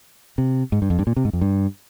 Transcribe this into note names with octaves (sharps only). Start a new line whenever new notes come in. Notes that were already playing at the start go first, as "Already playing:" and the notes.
C3
G#2
G2
F2
G2
A#2
C3
G#2
F2
G2